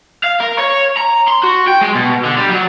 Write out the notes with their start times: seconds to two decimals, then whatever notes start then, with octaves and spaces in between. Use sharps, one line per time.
0.23 F5
0.40 A#4
0.58 C#5
0.97 A#5
1.28 C6
1.44 F#4
1.68 G5
1.81 G#3
1.95 B2
2.24 D3
2.37 G3
2.50 F#3